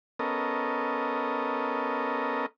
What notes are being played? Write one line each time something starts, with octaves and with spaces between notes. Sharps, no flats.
B3 C#4 A4 A#4 D#5